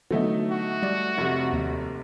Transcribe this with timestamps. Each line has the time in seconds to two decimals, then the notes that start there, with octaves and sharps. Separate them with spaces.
0.11 D3 E3 F#3 A3 B3 D#4
0.51 F#4
0.83 G3 D5
1.18 F1 C3
1.53 D#2